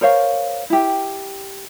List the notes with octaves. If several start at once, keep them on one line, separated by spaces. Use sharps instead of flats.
A#4 C5 C#5 F5
E4 G4